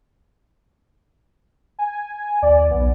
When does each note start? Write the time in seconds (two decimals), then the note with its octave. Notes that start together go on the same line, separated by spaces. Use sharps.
1.79 G#5
2.42 D#2 D5
2.71 B1 B3